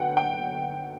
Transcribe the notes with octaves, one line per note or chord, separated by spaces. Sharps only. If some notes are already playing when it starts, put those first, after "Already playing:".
Already playing: D3 F#3 B3 F#5 G5
G5